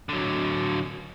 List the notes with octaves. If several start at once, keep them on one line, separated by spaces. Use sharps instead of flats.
D3 F#3